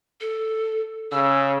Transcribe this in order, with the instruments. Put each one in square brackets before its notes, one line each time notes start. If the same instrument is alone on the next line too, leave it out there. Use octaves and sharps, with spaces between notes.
[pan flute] A4
[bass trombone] C#3 [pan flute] E6